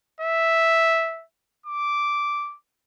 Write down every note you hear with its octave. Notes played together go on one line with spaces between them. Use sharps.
E5
D6